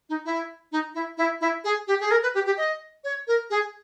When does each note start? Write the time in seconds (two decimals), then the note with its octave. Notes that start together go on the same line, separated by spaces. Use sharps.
0.09 D#4
0.25 E4
0.72 D#4
0.95 E4
1.18 E4
1.41 E4
1.64 G#4
1.87 G4
2.00 G#4
2.11 A#4
2.23 B4
2.35 G4
2.46 G4
2.57 D#5
3.04 C#5
3.27 A#4
3.50 G#4